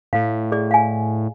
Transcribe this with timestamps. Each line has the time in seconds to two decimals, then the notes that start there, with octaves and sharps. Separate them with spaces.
0.13 A2 F5
0.52 G#4 D5
0.71 F5 G#5